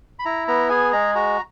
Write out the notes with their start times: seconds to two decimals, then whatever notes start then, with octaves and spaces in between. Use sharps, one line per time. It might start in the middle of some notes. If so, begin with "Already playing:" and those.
0.19 B5
0.25 E4 A#5
0.48 B3 A#5
0.69 G#4 G#5
0.93 G#3 A#5
1.15 F#4 A#5